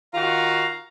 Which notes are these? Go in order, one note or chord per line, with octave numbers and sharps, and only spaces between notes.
D#3 F4 F#4 F5 A#5